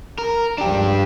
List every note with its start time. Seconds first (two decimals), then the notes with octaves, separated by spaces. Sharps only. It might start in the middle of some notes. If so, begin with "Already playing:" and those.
0.18 A#4
0.58 C#2 G2 F3 D4 G4